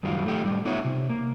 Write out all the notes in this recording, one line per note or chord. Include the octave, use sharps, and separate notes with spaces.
F#2 D#3 F#3 G3 F4
A3 G4 A4
A2 G3
A3 B3 D#4 F4 C#5 E5
C3
A#3